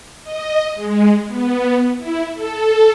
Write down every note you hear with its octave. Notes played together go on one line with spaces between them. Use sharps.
D#5
G#3
B3
E4
A4